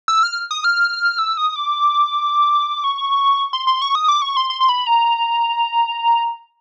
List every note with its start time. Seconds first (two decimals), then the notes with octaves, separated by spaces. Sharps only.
0.08 E6
0.23 F6
0.51 D#6
0.64 F6
1.19 E6
1.37 D#6
1.56 D6
2.84 C#6
3.53 C6
3.67 C6
3.82 C#6
3.95 D#6
4.08 D6
4.22 C#6
4.37 C6
4.50 C6
4.61 C6
4.69 B5
4.87 A#5